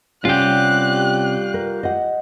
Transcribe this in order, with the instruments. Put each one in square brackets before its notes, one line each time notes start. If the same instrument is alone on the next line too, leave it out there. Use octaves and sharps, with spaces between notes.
[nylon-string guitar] C3 C#4 [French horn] G3 [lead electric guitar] F4 G4 [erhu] F#6
[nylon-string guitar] A#4
D#5 F#5